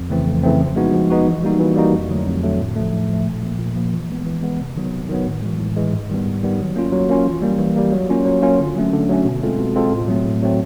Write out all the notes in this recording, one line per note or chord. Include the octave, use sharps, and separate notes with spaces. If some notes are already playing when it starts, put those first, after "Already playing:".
Already playing: F2
C#3 E3 A3 C4
F2
C#3 E3 A3 C4
F3
G#3 B3 D#4 F#4
F3
G#3 B3 D#4 F#4
E3
G3 A#3 D#4 F#4
E3
G3 A#3 D#4 F#4
F2
D3 F#3 A3
F2
D3 F#3 A3
A2
F3 A3
A2
F3 A3
A#2
F3 A#3
A#2
F3 A#3
E3
G#3 B3
E3
G#3 B3
C3
D#3 F#3 B3
C3
D#3 F#3 B3
A2
E3 G#3
A2
E3 G#3
G#2
D#3 G3 B3
G#2
D#3 G3 B3
F#3
A#3 C#4 F4
F#3
A#3 C#4 F4
E3
G3 A#3
E3
G3 A#3
F#3
A#3 C#4 F4
F#3
A#3 C#4 F4
D3
F#3 A3 C#4
D3
F#3 A3 C#4
B2
G#3 C4 F4 A4
B2
G#3 C4 F4 A4
A2
F#3 A3 C4
A2
F#3 A3 C4